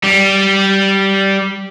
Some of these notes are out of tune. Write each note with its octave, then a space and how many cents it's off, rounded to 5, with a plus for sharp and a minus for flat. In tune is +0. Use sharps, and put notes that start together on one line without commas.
G3 -10